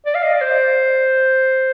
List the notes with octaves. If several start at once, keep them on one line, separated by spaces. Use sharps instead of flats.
D5
F5
D#5
D5
C5